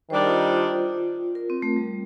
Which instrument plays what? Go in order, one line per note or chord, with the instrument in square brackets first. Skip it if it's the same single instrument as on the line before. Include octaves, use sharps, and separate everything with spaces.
[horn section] D#3 G3 D4 [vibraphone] C5
[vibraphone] F4
F4
A#4
C4
A3
G3